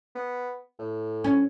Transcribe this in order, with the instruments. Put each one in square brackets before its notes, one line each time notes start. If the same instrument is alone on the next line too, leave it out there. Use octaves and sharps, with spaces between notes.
[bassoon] B3
A2
[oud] C#4